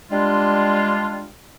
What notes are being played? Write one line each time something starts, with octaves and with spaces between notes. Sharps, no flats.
G3 G#3 D4 F4